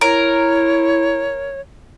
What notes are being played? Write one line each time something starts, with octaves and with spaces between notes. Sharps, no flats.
E4 A#4 C#5